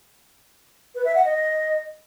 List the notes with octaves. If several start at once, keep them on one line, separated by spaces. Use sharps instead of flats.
B4
E5
F#5
D#5